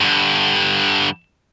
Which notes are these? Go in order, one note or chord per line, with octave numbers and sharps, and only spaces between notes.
G2 D3